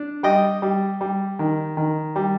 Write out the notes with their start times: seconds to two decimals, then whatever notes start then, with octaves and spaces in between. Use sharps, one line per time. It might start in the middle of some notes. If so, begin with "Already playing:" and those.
Already playing: D4
0.23 G3 D#5 G5
0.62 G3
1.01 G3
1.39 D#3
1.77 D#3
2.16 G3